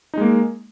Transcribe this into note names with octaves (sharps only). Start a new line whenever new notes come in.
G#3 A#3 D#4